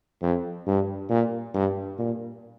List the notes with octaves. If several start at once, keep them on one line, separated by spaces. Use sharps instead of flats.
F2
G2
A#2
G2
A#2